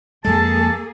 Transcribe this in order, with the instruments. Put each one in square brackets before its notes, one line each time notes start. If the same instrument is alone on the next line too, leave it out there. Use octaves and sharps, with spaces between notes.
[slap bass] F2 G#3 [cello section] A#3 G#4 [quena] A4 [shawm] A5